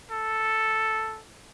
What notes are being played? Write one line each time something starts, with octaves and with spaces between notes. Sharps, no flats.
A4